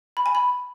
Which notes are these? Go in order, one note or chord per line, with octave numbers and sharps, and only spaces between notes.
B5
G#5
B5